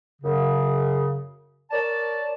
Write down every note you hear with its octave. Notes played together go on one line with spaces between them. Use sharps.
F#2 C#3
A#4 C#5 D5 A5